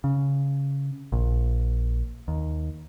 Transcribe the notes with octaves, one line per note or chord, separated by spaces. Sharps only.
C#3
A#1
D#2